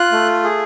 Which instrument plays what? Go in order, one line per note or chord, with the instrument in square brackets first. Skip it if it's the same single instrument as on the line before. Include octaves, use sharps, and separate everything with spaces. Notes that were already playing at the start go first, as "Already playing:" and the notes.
Already playing: [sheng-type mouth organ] F4 F#6
A3
G#4